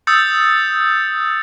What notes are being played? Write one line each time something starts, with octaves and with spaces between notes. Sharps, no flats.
D#6 E6 G6 A6 C#7